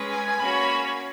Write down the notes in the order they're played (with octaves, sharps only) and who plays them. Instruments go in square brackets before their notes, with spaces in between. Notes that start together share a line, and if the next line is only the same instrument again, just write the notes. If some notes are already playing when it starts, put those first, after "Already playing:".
Already playing: [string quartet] G#3 C#4 G#4 B4
[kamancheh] G#5
[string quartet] A#3 C#4 F#4 C#5 [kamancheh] B5